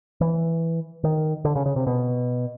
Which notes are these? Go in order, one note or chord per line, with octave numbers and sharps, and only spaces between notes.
E3
D#3
D3
C#3
C#3
C3
B2